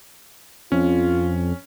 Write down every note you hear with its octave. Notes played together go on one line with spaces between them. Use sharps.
F2 C#4 F4